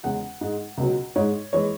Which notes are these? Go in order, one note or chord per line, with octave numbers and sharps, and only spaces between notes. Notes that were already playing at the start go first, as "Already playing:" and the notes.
E2 C#3 G#3 F#5
G#2 G#3
C#2 B2 F#3
G#2 G#3 C#5
E3 G#3 C#5